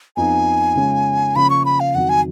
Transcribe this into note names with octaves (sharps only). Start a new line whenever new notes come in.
F2 F3 B3 D#4 G#5
C#3 G#3 C#4 F4
C#3 F3 A#3 C#4 B5
C#6
B5
F5
F2 D#3 F#3 F#5
G#5